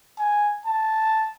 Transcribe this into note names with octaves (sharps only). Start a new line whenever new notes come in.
G#5
A5